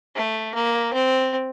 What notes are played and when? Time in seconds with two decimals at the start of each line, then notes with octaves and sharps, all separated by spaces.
0.15 A3
0.54 A#3
0.93 C4